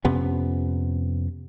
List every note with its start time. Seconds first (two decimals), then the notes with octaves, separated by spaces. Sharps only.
0.04 F2 C3 B3 C#4